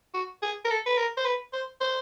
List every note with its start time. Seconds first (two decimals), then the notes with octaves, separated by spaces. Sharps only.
0.14 F#4
0.42 G#4
0.65 A#4
0.70 A4
0.87 B4
0.98 A#4
1.17 C5
1.25 B4
1.53 C5
1.81 C5